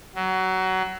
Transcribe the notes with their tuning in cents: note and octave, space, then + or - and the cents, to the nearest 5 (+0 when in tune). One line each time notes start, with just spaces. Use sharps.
F#3 +20